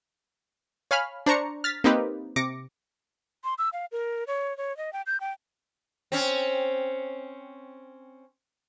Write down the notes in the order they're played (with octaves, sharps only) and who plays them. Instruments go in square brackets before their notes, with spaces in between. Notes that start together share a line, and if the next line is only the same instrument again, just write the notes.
[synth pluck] C#5 F5 G#5 B5 F6
D4 C5 A#5 C#6 C#7
F6 A6 B6
A#3 C4 D#4 G4 B4
C3 D6 A#6 C#7
[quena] C6
E6
F5
A#4
C#5
C#5
D#5
G5
G6
G5
[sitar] C4 C#4